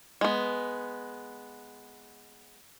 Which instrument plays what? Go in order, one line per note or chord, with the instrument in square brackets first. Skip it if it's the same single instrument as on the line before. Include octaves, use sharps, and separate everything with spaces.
[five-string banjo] G#3 B3